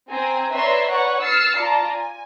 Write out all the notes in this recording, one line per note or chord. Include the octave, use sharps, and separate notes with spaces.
C4 G#5 A#5
B4 C#5 D5 E5 A#5 C6
B4 C#5 F#5 C#6
E6 F6 A6 C7 C#7
F4 D5 A5 A#5
G#5